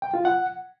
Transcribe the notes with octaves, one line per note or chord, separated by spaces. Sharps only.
G5
F4
F#5